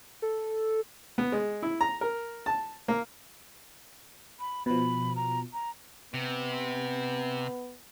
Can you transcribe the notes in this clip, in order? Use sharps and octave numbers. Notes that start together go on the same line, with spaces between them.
A4
B3
G#3
E4
A#5
A#4
A5
A#3
B5
B2 F3 B5
A#5
A#5
C3 B3